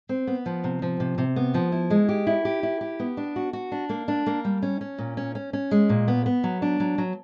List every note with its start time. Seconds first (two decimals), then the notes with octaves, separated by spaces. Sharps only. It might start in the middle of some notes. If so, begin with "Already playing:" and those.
0.09 C4
0.27 B3
0.46 F3
0.64 C3
0.82 F3
1.00 C3
1.18 C3
1.36 B3
1.54 F3
1.72 E4
1.90 G#3
2.09 G4
2.27 E4
2.45 G4
2.63 E4
2.81 G4
3.00 B3
3.17 D4
3.36 F#4
3.53 F#4
3.72 D4
3.89 A#3
4.08 D4
4.26 A#3
4.45 G3
4.62 C#4
4.81 C#4
4.98 A#2
5.17 C#4
5.35 C#4
5.53 C#4
5.71 G#3
5.89 A#2
6.08 B3
6.26 B3
6.44 F#3
6.62 D4
6.80 F#3
6.98 F#3